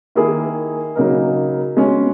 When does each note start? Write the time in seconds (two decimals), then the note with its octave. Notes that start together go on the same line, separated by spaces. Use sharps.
0.15 D#3 A#3 E4 G#4
0.95 C#3 F#3 A#3 D#4 A#4
1.76 B2 G#3 C#4